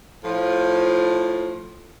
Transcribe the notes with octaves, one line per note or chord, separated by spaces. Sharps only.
A2 F3